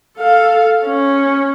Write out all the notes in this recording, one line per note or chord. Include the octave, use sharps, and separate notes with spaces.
A4 F5
C#4